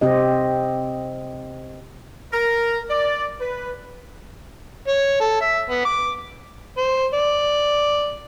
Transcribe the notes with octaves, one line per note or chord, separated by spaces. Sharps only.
C3 C4 G4 D#5
A#4
D5
B4
C#5
A4
E5
B3
D6
C5
D5